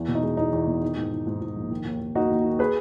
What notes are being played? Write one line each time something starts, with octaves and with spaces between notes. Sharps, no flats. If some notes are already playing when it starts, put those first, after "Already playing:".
Already playing: E2
B2
D#4
G#3
E2 D#4
E2
B2
D#3
G#2
D#3
G#2
G#2
A#1
D#3
D#2
D#2
A#3 D#4 F#4
D#2
D#3
G#4 B4